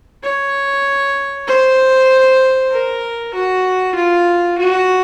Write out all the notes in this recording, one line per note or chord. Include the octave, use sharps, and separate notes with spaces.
C#5
C5
A#4
F#4
F4
F#4